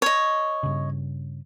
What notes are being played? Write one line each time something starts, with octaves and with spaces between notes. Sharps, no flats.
C#5 D#5
G2 C#3